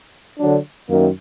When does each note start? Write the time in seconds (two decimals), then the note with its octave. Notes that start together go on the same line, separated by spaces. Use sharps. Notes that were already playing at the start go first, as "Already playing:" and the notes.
0.38 D3 F#3 D4
0.89 F#2 D#3 A#3